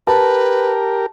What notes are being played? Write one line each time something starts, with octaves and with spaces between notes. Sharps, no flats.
G4 A#4 B4 A5